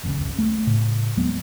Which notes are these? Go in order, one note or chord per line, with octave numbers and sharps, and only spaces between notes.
F1 C#2 A#2 C#3
F#1 C#2
A3
A2 C#3
D#2 F#3 G#3 B3